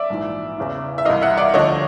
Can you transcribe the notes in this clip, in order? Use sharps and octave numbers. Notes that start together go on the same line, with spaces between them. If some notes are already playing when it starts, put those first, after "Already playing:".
Already playing: D5 E5
A#1 G#2 E3
E2 C#3 E3
E5
C2 C3 E3 D#5 F5
E5 F#5
D5 E5
D2 D3 F3 C#5 D#5